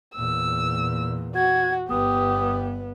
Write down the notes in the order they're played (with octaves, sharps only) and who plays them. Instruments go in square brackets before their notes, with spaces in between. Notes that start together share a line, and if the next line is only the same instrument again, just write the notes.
[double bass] E2 A#2 [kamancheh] E6
[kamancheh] F#4 [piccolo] G#6
[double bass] G1 B3 [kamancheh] G4 [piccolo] D#6